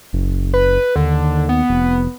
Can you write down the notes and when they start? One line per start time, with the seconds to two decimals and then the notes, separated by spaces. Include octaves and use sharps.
0.13 F#1
0.54 B4
0.96 D#2 D3
1.49 B3
1.69 F1